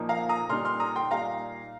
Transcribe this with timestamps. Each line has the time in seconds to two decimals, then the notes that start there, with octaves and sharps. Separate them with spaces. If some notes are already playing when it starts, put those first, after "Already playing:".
Already playing: A#2 F3 A#3 D#4
0.09 F5 A#5
0.29 A#5 D#6
0.50 A#2 G3 D#4 C6 F6
0.65 C6 F6
0.80 A#5 D#6
0.96 G5 C6
1.11 A#2 G3 D#4 F5 A#5